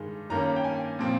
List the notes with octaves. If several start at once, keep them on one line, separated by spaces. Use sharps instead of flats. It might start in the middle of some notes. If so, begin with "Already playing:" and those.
Already playing: G2 D#3 G#3
G2 D#3 A#3 C#4 A#5
G5
G#5
A#2 F3 C4